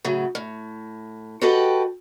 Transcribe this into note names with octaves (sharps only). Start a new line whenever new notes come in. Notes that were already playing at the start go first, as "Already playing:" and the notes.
A2 C#3 F#3
A2
F#4 G4 A4 B4 D#5 G5